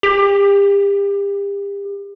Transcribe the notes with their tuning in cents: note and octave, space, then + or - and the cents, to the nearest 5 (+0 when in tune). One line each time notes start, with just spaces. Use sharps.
G4 +35